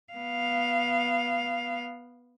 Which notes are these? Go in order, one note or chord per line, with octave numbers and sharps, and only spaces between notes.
B3 F5